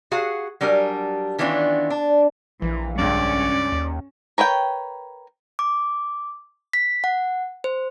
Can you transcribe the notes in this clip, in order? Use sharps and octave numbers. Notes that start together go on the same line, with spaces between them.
F#4 G#4 F5 F#5
F#3 G3 D4 A#4 G#5
D#3 E3 B3 C#4 D4 F4
D4
A#1 E3
C#2 G2 C#4 D5
D#2
A#4 B4 C#5 G5
D6
B6
F#5
C5